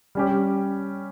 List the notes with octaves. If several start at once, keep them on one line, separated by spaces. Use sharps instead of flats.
G3 C#4 G4